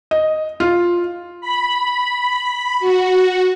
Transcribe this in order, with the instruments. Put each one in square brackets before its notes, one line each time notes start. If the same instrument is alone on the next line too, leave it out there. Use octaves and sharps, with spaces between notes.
[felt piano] D#5
F4
[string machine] B5
F#4